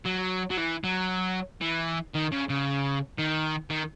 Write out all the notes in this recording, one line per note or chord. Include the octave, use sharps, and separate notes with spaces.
F#3
F#3
E3
F#3
E3
D#3
C#3
C#3
D#3
D#3